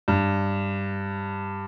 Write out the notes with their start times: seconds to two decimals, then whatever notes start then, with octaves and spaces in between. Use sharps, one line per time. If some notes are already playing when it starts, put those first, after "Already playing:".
0.08 G2